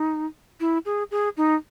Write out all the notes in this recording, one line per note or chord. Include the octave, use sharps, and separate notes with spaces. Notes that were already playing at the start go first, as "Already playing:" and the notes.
Already playing: D#4
E4
G#4
G#4
D#4